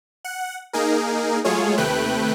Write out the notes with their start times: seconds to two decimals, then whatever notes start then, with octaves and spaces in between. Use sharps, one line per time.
0.25 F#5
0.73 A#3 D#4 G#4 A#4
1.45 F#3 G#3 A3 F4 G#4 C#5
1.78 D#2 C3 A3 B4 G5 F#6